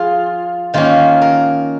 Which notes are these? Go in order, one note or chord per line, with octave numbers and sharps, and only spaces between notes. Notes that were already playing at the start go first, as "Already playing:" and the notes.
Already playing: F3 F4 G#4
D#3 A#3 C#4 F4
A#4